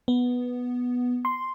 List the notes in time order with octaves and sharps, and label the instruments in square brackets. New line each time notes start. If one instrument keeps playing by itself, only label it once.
[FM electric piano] B3
C6